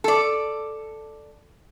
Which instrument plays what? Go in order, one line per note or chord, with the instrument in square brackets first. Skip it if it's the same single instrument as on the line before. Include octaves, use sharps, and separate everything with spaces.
[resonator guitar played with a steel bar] A4 D5